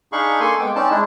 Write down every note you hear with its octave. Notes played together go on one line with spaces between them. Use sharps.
D4 D#4 G#4 F5 B5 C#6
A#3 A4 G#5 C6
G#3 B3 G5 D6
C4 C#4 D#4 D5 A5
G#3 D4 E4